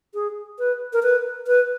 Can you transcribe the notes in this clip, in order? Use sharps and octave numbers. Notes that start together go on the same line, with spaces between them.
G#4
B4
A#4
B4
B4